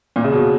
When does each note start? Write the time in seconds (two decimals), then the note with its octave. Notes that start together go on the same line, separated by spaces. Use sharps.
0.16 A#2
0.24 C#3
0.32 B2